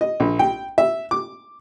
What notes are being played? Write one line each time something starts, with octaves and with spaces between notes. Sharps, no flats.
D#5
A#1
G5
E5
D6